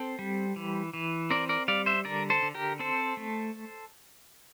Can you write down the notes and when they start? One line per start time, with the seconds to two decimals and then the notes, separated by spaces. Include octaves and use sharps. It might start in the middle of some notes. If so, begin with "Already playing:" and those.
Already playing: C4 A4 C5
0.19 G3
0.56 E3
0.93 E3
1.30 C4 A#4 D5
1.49 A#4 D5
1.68 G3 D5 F5
1.86 C5 E5
2.05 D3 A#4 D5
2.30 A4 C5
2.42 D3
2.55 G4 A#4
2.79 C4 A4 C5
3.17 A3